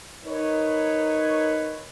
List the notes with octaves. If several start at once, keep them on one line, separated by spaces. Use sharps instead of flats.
D#4 A#4 B4 C#5